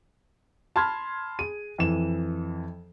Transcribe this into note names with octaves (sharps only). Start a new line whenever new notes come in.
A5 B5 C6 F6 G#6
G#4 D#7
F2 E3 E7